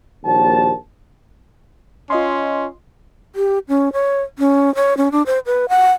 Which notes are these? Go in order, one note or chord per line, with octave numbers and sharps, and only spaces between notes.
A#1 D#2 G3 F#4 C5 A5
C#4 F4 D#5 C6
G4
C#4
C#5
C#4
C#5
C#4
D4
C5
B4
F#5